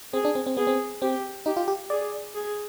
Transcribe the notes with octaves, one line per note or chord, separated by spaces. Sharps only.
C4 G#4
D4
C4
C4
B3 G#4
C4
C4 G4
D#4 G4
F4
G4
G#4 D5
G#4